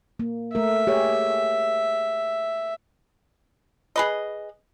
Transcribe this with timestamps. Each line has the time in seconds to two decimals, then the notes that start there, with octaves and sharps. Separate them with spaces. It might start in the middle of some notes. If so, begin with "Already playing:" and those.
0.19 A#3
0.55 A3 A#4 E5
0.87 G4 G#4 C#5
3.96 G#4 B4 D#5